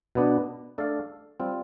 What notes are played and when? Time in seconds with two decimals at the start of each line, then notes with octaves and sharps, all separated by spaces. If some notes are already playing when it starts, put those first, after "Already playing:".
0.15 B2 B3 D4
0.78 A3 D4 A4 D5 F5
1.40 G3 C4 F4